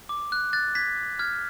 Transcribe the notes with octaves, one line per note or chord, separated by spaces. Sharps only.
D6
F#6
F#6 A6
G#6 B6
F6 G#6